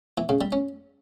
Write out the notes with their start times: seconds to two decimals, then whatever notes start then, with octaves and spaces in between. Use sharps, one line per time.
0.18 E3
0.29 C#3
0.41 G3
0.52 C#4